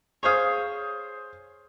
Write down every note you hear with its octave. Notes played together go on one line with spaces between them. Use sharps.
G#4 C5 C#5 F5 D#6